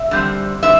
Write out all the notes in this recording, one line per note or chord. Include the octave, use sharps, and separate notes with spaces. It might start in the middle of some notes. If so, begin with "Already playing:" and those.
Already playing: E5
D3 G3 C4
D3 G3 C4 E5